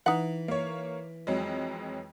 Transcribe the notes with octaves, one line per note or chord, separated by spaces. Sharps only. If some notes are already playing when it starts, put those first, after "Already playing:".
E3 D#4 F#5
A#3 C#5
F2 F#3 G#3